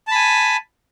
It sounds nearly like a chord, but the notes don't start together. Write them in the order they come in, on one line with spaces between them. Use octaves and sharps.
A5 B5 G#5